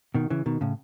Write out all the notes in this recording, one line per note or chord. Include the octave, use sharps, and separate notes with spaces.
B2 D#3
C#3 E3
B2 D#3
A2 C#3